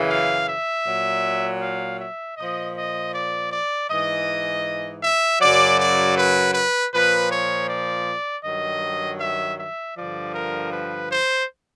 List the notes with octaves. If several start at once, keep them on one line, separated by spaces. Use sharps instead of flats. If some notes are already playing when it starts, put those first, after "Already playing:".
Already playing: F#2 C#3 E3
F5
E5
A#2 F#3
F5
E5
A#2 F3 D#5
D#5
D5
D5
G#2 E3 D#5
E5
F#2 C#3 F#3 D5
D5
B4
B4
A#2 F3 B4
C#5
D5
G2 D#3 F#3 D#5
E5
E5
G2 D3 F3 D5
A#4
B4
C5